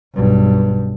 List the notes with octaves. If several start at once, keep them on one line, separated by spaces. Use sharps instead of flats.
B1 G2